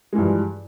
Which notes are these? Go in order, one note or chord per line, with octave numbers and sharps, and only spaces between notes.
G2 E3 F3 G#3